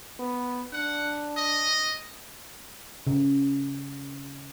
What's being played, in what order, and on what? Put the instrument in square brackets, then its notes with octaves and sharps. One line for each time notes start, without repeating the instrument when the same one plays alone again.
[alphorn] B3
[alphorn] D4 [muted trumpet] F#5
[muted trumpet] D#5
[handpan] C#3